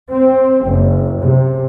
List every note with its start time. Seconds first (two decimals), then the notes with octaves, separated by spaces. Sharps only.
0.11 C4
0.67 F#1
1.22 C3